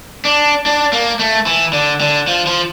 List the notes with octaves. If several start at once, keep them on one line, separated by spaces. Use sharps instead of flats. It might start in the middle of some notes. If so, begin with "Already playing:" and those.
D4
D4
A#3
A3
E3
D3
D3
F3
F3